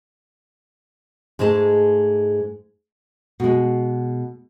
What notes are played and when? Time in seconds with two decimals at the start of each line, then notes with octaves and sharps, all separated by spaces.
1.39 G#2 G#3 A3 A5
3.40 B2 G#3